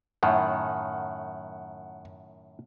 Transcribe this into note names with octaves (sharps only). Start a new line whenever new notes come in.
F#2 A2 D#3 F#5